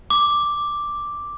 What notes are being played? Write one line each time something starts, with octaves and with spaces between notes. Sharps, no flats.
D6